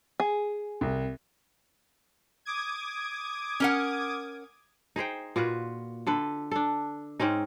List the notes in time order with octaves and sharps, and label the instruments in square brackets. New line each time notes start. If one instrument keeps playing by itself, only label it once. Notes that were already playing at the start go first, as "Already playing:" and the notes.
[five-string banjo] G#4
[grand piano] C2
[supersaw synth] D6 D#6 G#6
[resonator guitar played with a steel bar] C#4 A#4 F#5
[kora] D#4 G#4 C5 G5
A#2 F4 F#4 B4
D3 A4 B4
D4 A4
G#2 C4 C#4 D#4